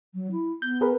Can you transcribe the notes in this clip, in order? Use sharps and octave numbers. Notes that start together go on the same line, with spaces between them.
F#3
E4
B3 G6
G#4 A#4 B4